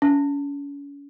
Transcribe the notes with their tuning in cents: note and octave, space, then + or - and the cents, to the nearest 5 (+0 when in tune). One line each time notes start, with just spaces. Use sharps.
C#4 +35